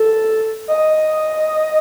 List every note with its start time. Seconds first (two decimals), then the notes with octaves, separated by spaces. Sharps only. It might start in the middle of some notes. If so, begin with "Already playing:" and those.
Already playing: A4
0.68 D#5